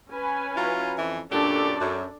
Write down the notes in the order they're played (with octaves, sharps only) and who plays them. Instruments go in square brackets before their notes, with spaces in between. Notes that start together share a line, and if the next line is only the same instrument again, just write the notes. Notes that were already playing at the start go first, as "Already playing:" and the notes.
[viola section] C#4 B4 G#5
[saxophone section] F#3 E4 F4
F2 E3
[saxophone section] F#2 A#2 G4 [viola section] D4 A4 D5
[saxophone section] F#2